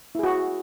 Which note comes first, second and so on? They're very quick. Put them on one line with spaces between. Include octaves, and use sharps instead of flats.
E4 G#4 F#4